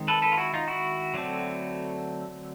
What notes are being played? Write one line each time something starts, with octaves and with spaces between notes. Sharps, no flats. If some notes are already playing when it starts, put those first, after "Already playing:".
Already playing: D#3 G#3 C4
A4 B4
A4 B4
F4
E4 F#4
D#4 F4
E4 F#4
D3 F#3 A3 C4